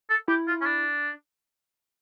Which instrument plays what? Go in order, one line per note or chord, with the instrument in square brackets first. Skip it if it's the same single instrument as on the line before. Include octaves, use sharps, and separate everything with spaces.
[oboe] A4
[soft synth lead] E4 [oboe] G4
[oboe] F4
C#4
D4